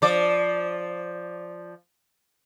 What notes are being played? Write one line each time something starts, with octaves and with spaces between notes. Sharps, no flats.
F3 D5